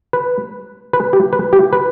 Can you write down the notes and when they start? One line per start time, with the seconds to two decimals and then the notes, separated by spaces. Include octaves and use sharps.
0.13 B4
0.93 B4
1.13 G4
1.33 B4
1.53 G4
1.73 B4